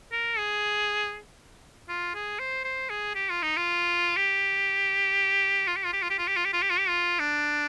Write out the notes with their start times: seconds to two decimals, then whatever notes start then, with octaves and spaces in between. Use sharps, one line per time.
0.12 A#4
0.37 G#4
1.89 F4
2.14 G#4
2.39 C5
2.64 C5
2.90 G#4
3.15 G4
3.29 F4
3.42 D#4
3.57 F4
4.16 G4
5.67 F4
5.76 G4
5.85 F4
5.93 G4
6.02 F4
6.10 G4
6.18 F4
6.27 G4
6.36 F4
6.45 G4
6.53 F4
6.62 G4
6.70 F4
6.79 G4
6.88 F4
7.19 D4